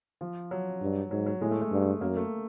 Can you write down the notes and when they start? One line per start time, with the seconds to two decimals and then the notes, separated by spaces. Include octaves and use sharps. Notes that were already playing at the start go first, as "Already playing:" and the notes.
0.21 F3
0.51 F#3
0.81 G2
1.10 G#2 F#3
1.26 F#3
1.41 A2 G#3
1.51 A3
1.61 A3
1.71 G2
2.01 F#2 A#3
2.16 A3